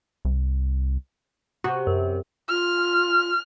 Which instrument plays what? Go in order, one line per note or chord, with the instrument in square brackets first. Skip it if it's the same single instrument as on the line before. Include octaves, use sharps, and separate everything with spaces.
[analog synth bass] C2
[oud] C3 [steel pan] F#4
[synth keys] F#2
[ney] F4 [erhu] F6